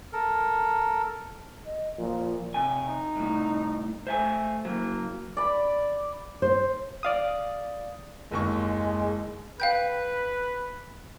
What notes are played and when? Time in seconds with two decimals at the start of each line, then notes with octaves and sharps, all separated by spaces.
0.13 A4 A#4
1.66 D#5
1.98 A#2 F3
2.54 C3 G#5
2.82 D#4
3.17 C2 A2
4.07 A3 C5 E5 G#5
4.65 C#3 F#3 A#3
5.37 D5 B5
6.42 C5
7.03 D5 F5 D#6
8.31 F#1 D#2 G#3 C#6
9.60 B4 F5 G5 G6